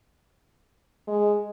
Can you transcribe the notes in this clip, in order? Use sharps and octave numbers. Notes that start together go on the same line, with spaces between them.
G#3